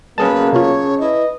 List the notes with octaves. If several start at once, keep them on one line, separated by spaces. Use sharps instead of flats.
F#2 B2 G3 A#3 C#4 G#4 B4 A5
C3 F4 C#5
E4 B4 D#5